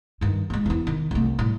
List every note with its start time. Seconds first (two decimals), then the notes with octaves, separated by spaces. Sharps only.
0.21 G2 D#3
0.50 G3 G#3
0.66 E2 E4
0.87 D#3
1.11 C2 A3
1.39 A2 G3